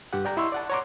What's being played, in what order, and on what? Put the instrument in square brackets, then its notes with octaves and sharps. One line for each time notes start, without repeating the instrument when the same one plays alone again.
[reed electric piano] G2 G4 F#5
D5 G5 A#5
E4 D#5 C6 C#6 E6
D5 F#5 A5
C#5 F#5 A#5 C6 D6